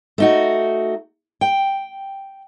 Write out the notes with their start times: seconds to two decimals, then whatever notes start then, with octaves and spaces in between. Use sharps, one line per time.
0.18 A3 D#4 F#4
1.41 G5